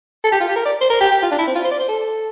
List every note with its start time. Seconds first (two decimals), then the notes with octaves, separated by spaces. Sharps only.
0.24 A4
0.32 G4
0.40 F4
0.49 G4
0.56 A#4
0.65 D5
0.81 C5
0.90 A#4
1.01 G4
1.12 G4
1.22 F4
1.31 D4
1.38 E4
1.47 C4
1.55 F4
1.64 C5
1.71 D5
1.80 C5
1.88 A4